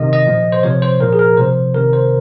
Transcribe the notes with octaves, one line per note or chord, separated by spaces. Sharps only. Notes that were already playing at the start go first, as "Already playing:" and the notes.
Already playing: C3 D#3 D#5
D#5
A#2 F3
C5
C3 F3 C#5
C5
A#2 F3 A#4
G#4
A#4
C3 F3 C5
C3 D#3 A#4
C5